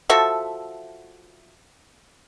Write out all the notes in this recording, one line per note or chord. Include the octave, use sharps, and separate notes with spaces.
F3 F#4 A4 E5